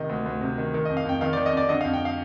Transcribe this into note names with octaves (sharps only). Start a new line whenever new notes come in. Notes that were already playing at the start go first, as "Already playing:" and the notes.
Already playing: C3 D#3 D#5
D2
D2
C3
D#3
D#3
D#5
F2
F5
F2 G5
D#3 F5
D5
D#3
D#5
F2 D5
D3 D#5
F5
F2
G5
F5